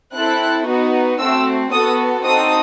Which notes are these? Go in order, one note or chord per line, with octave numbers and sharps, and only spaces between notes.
C4 E4 A4 F#6
B3 D#4 F#4
A3 C4 F#4 E6
B3 F#4 A4 D#6
C4 D#4 F#4 A4 D#6